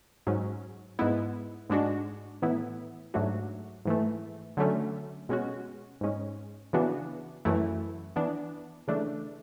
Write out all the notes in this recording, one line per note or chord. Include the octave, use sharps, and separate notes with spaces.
G#2 F#3 C#4
G#2 G#3 B3 E4
G#2 G#3 D4 F#4
A2 E3 B3 E4
G#2 F#3 A3 D4 F#4
G#2 E3 A3
D3 F#3 A3 C#4
B2 G#3 C#4 F#4
G#2 G#3 C#4
C#3 E3 B3 D4 F#4
F#2 E3 A3 E4
E3 B3 D4
C#3 E3 A3 D4